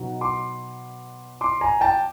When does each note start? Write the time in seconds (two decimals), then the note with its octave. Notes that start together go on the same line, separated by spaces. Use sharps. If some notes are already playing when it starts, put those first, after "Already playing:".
Already playing: B2 F#3 B3 D#4
0.21 C6 D6
1.41 C6 D6
1.61 G#5 A#5
1.81 G5 A5